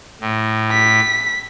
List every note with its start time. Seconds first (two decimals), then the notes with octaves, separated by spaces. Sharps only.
0.21 A2
0.72 B6